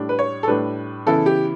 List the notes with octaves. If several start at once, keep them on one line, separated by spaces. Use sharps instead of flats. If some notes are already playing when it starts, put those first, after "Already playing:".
Already playing: A2 G3 D4
B4
C#5
A4
A2 G3 D4 B4
C#3 E3 B3 E4 A4
G4